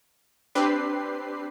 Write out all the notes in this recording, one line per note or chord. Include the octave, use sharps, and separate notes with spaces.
C4 D4 G4 B4 C7